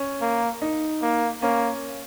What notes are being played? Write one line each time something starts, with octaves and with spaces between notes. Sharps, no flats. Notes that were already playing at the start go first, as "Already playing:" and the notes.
Already playing: C#4
A#3
D#4
A#3
A#3 C#4